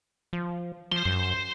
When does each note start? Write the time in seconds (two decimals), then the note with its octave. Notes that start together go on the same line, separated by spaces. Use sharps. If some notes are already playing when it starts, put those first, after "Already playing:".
0.33 F3
0.92 F3 C5 C6
1.05 F#2